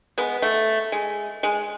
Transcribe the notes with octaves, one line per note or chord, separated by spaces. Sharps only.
G#3 B3
A3
G#3
G#3